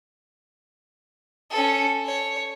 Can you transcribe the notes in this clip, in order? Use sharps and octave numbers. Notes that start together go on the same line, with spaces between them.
C#4 A4
C#5